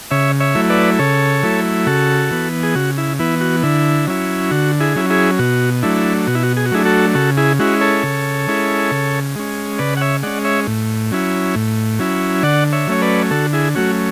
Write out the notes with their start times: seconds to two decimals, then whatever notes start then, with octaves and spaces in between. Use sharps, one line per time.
0.11 C#3 C#5 E5
0.40 C#5 E5
0.55 F#3 A3 E4
0.70 B4 D5
0.99 C#3 A4 C#5
1.43 F#3 A3 E4
1.87 C#3 F#4 A4
2.31 E3 B3
2.63 G#4
2.75 C#3 F#4
2.98 E4
3.19 E3 B3 E4
3.41 F#4
3.63 D3 E4
4.07 F#3 C#4 E4
4.51 D3 F#4
4.80 E4 G#4
4.96 F#3 C#4 E4
5.10 E4 G#4
5.39 B2 F#4
5.83 F#3 A3 D4 E4
6.27 B2 F#4
6.35 E4
6.43 F#4
6.57 G#4
6.66 F#4
6.71 F#3 A3 D4 E4 G#4
6.85 F#4 A4
7.15 C#3 F#4 A4
7.37 E4 G#4
7.59 G#3 C#4 E4 F#4
7.81 A4 C#5
8.03 C#3
8.47 G#3 C#4 E4
8.91 C#3
9.36 G#3 C#4
9.79 C#3 B4 D5
9.97 F#5
10.01 C#5 E5
10.23 G#3 C#4 D5 F#5
10.45 C#5 E5
10.67 A2
11.11 F#3 C#4 E4
11.55 A2
11.99 F#3 C#4 E4
12.43 D3 D5 F#5
12.73 C#5 E5
12.87 F#3 A3 C#4 C#5
13.02 B4 D5
13.31 D3 F#4 A4
13.53 E4 G#4
13.75 F#3 A3 C#4 F#4